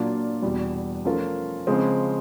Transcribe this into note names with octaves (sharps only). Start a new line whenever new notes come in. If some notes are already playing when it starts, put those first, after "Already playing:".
Already playing: A#2 F#3 A#3 D4 F4
E2 B2 G3
F3 A3 C#4 F4 A#4
C#3 F3 G#3 C4